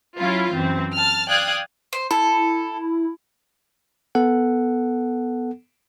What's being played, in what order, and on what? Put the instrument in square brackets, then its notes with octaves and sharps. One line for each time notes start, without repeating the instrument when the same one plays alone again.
[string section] F#3 C#4 E4 F4
F#2 E3 C4
A5 F6
D5 F5 G5 D#6 F#6 G#6
[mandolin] C5
[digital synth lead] E4 [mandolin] A4
[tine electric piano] B3 A4 F#5